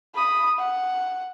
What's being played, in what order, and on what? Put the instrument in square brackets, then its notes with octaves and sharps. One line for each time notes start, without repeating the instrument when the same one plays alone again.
[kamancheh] B5 D#6
F#5